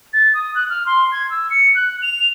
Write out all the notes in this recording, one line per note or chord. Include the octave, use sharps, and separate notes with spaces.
A6
D#6
F#6
F6
C6
G#6
E6
C#7
F#6
F7